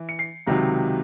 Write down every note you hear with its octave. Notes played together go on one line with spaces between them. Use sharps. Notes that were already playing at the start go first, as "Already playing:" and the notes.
Already playing: E3
C#7
C7
C#2 C3 D#3 F#3